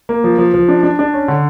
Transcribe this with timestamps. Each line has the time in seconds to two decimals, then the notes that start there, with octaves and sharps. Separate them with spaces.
0.09 A#3
0.24 F3
0.38 F3
0.54 F3
0.69 D4
0.83 D4
0.99 D4
1.14 C#4
1.28 D3